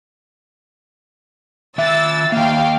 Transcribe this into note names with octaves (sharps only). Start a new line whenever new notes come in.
D#3 E5 E6 A6
D#3 A#3 F5 G5